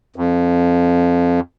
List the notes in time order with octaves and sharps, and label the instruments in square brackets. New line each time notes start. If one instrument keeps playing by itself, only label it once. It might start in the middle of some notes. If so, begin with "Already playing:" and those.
[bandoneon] F2